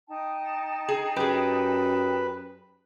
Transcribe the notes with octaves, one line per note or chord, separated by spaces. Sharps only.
D#4 G5 A5
G#4
F#2 G4 G#4 B4